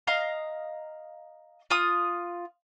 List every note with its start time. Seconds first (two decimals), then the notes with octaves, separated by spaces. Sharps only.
0.07 D#5 F5 A#5
1.70 F4 D#6